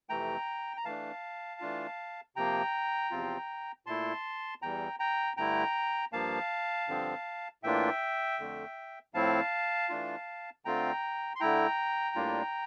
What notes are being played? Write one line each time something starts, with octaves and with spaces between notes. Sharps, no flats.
F2 C3 E3 A3 G5 A#5
A#5
E3 A3 D4 F5 A5
E3 A3 D4 F4
C3 F3 A#3 G5 A#5
E2 C3 F3 C4 F4
A#2 A3 E4 A5 C6
E2 E3 G3 G5 A#5
G5 A#5
G2 D3 A3 E4 G5 A#5
G2 F3 A#3 F5 A5
G2 D3 F3 C4
A2 E3 A#3 D4 F4 E5 G5
F2 D3 A3
A2 F3 A3 C4 E4 F5 A5
E3 A3 D4 F4
D3 A3 C4 F4 G5 A#5
C6
D3 A3 E4 G5 A#5
A2 G3 A#3 D4 F4